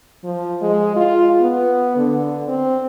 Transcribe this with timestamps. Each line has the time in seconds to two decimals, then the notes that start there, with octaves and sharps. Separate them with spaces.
0.24 F3
0.62 G#3
0.96 F4
1.41 B3
1.97 D3
2.48 C4